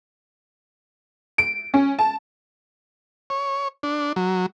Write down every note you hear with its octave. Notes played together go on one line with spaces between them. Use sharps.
D7
C#4
A5
C#5
D4
F#3